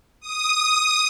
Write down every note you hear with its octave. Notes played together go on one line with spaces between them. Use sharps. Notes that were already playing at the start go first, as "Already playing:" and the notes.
D#6